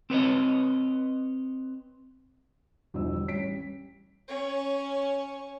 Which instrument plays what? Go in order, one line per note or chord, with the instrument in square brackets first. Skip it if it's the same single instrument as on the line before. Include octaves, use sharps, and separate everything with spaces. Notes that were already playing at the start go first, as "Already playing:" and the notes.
[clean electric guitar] C4 B4 C#5 D#5
[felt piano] G1 E2 B2 F3 C5 E6
G3
A1 G3 C#5 B6 D7
[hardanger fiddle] C#4 C#5